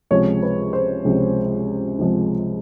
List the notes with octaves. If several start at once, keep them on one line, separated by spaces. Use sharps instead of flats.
C#2 C3 F3 G#3 C#5
B4
C5
C#2 C3 F3 G#3
C#2 C3 F3 G#3